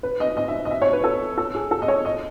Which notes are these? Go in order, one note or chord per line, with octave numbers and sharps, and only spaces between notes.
B4
D#5
D#5
E5
D#5
E5
C#5
B4
A4
A4
G#4
A4
D#5
C#5
D#5